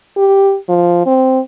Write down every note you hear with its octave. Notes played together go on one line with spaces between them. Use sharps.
G4
F3
C4